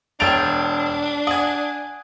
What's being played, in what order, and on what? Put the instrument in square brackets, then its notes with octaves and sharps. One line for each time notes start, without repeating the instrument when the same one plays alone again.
[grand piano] E1 D7 F7 [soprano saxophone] D4 [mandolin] C#5 G5 A5
[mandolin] F#5 G#5 [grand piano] D#6